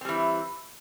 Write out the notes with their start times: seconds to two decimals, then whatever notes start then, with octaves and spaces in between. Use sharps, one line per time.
0.01 C4
0.05 G3
0.09 E3